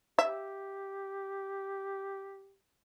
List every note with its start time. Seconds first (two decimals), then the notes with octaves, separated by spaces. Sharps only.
0.19 G4 E5